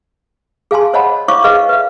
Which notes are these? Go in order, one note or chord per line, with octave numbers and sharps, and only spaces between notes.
G#4 F5 G#5 A5 C6
C5 C#5 D#5 F#5 A5 B5
E4 C5 C#5 F5 C#6 D6
G#4 B4 D#5 F5
B4 E5 F5